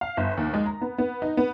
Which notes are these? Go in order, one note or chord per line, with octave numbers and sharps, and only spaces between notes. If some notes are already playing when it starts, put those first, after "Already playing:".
F5
G1
D#2
G#3
A#5
B3
B3
D#4
B3